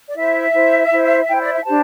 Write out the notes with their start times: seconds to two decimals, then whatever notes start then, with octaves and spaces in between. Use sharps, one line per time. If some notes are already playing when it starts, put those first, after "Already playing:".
0.09 D5
0.16 E4 C5 E5
0.54 E4 C5
0.91 E4 C5
1.28 E4 C5 G5
1.41 D5
1.52 E5
1.65 D4 G4 C5 A5